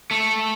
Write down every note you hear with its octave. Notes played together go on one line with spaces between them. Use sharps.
A3